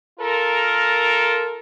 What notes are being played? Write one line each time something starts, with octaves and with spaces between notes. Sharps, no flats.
F4 A4 A#4